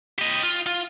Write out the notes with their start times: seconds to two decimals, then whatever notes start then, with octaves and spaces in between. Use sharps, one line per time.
0.19 G4 D#5
0.43 F4
0.66 F4